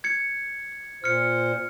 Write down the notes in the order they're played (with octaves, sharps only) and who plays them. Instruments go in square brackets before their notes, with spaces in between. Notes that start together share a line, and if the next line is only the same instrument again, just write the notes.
[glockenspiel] G#6 C#7
[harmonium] A#2 C5 [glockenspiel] F6 C#7